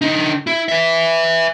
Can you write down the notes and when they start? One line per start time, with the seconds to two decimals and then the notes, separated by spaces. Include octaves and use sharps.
0.02 D3 D#4
0.47 E4
0.69 B4 E5